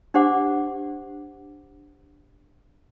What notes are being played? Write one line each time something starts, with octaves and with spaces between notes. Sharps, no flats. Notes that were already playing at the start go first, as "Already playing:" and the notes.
D4 G4 C5 F#5 D6